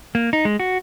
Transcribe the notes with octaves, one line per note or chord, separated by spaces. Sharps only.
A#3
D#4
G#3
F#4